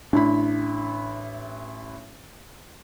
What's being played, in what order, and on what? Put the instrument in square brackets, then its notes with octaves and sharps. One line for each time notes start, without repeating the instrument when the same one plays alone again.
[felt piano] A1 E4 B5 [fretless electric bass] D4